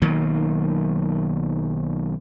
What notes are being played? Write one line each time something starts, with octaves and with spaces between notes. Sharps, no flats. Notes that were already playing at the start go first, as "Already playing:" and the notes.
B1 D#3 F#3 A#3